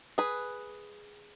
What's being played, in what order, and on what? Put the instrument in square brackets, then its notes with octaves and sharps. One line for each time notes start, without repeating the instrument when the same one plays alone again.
[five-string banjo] G#4 B4